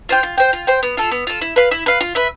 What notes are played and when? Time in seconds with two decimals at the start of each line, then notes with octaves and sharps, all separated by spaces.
0.09 F4 C5 G5
0.23 F4
0.38 C5 G5
0.53 F4
0.67 C5 G5
0.83 B3
0.97 F4 A4
1.11 B3
1.27 F4 A4
1.41 E4
1.56 B4 F5
1.71 E4
1.86 B4 F5
2.00 F4
2.15 B4 E5